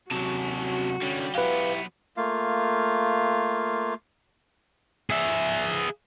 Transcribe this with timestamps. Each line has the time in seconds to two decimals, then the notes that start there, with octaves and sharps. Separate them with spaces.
0.11 C3 F#3 C#4 F#4 A5
1.02 D3 G3 C#4
1.35 F#3 B3 E4 G4 B4 F5
2.17 A3 A#3 F4 F5
5.10 G#4 E5